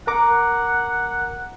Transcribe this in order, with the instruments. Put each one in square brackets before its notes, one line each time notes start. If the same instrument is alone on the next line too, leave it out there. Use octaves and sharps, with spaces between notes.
[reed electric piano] A#4 A#5 D6 [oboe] F#5